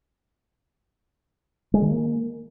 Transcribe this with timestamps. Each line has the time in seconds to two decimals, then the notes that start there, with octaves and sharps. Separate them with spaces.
1.74 G#3
1.82 D#3
1.90 A#3